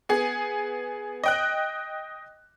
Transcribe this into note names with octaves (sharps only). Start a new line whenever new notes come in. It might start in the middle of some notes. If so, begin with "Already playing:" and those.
B3 G#4
D#5 G5 F#6